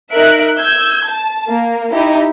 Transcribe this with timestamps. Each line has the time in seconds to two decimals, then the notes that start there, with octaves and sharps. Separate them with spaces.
0.12 D#4 A#4 E5 F#6 D7
0.59 E6 G6 G#6
1.08 A5
1.48 A#3
1.93 D#4 E4 G4